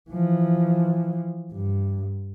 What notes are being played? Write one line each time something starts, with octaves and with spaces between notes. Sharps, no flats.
E3 F3
G2